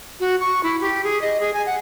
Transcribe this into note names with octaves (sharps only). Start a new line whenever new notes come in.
F#4
C#6
E4
G4
G#4
D#5
G#4
G#5
F#5